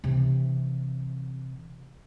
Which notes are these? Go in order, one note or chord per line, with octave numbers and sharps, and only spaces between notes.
C3 E3